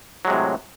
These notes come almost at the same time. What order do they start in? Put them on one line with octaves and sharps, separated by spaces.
F#3 G#3 C3 A2